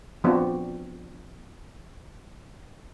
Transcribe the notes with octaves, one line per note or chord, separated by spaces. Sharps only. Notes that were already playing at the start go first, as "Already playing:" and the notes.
F3 B3 C4 D4 F#4